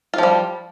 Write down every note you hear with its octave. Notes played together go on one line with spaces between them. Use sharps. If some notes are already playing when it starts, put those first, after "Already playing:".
F3 G3 F4